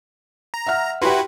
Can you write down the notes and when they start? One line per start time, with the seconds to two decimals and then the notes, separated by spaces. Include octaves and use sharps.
0.54 A#5
0.67 E5 F#5 F6
1.02 E4 F#4 G4 B4 C6